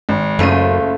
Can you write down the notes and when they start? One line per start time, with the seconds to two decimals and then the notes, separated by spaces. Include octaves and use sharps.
0.09 G#1
0.39 F#1 F#2 C#3 A3 F4 D#7